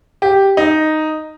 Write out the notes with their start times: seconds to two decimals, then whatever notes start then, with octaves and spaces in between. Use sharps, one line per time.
0.22 G4
0.57 D#4